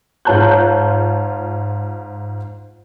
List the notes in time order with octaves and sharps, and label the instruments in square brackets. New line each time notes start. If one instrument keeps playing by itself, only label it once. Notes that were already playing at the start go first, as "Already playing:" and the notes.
[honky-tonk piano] G#2 F4 C#5 A5 F#6 G6